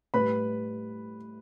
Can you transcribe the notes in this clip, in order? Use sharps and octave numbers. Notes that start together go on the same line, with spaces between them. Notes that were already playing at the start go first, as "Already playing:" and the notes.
A2 G3 B4 B5